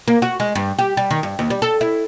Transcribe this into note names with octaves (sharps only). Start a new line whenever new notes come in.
A#3
F#4
G#3
G2
G4
G3
D#3
G2
D#2
G3
A4
E4